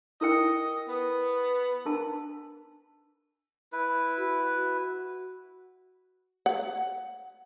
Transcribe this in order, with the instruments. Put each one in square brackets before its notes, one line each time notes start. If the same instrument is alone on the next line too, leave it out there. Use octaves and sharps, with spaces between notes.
[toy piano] E4 A#4 G5 [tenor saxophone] D#5
[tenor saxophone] B3
[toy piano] D4 A#4 A5
[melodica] E4 B4
[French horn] F#4
[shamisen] F#5